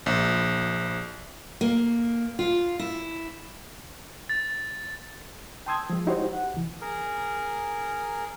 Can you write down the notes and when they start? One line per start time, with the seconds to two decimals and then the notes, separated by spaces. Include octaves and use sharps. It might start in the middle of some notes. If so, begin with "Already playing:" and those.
0.06 A#1
1.61 A#3
2.39 F4
2.79 E4
4.29 A6
5.66 G5 A5 C6 D#6 E6 G#6
5.90 F3 G#3
6.07 D#4 E4 F#4 G4 C5 C#5
6.33 F#5
6.54 C2 E3
6.81 G#4 A#4